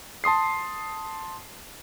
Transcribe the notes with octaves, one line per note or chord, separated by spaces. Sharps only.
A5 C6 D#6 C7